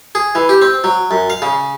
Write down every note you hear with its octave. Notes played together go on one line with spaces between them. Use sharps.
G#4
E3
G4
C4
F#3
F#2
F5
C#3